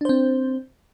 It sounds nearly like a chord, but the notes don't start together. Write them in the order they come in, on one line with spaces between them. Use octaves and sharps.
D4 C5 C4